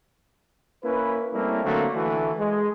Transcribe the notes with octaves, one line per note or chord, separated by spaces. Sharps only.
A#3 C#4 E4 B4
G3 A3 A#3 C4 C#4 E4
D3 F#3 A3 A#3 C4
D3 E3 A3 F#4 A4
G#3